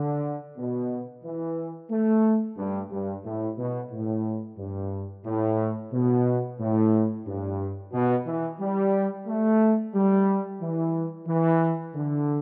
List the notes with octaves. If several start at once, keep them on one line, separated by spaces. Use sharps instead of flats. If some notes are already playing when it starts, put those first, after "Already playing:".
Already playing: D3
B2
E3
A3
G2
G2
A2
B2
A2
G2
A2
B2
A2
G2
B2
E3
G3
A3
G3
E3
E3
D3